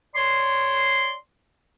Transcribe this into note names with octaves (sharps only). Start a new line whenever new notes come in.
C#5 D5 C6